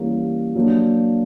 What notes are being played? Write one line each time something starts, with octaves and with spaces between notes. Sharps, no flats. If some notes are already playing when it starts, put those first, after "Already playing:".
Already playing: E3 G3 A#3 C#4
F#3 A#3 D4